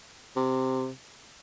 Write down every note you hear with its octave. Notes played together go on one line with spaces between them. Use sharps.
C3